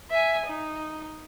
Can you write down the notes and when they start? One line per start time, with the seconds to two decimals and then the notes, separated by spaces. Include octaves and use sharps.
0.11 E5 G#5
0.47 D#4